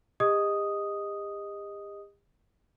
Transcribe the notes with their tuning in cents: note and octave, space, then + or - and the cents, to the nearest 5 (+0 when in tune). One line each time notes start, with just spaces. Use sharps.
G4 +45 D#5 +0 D#6 +0